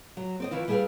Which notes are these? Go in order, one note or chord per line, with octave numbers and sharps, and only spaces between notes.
F#3
C4 D5 D#5
D#3 E3 E4 F4
G3 E4 G#4 A4 B4 F5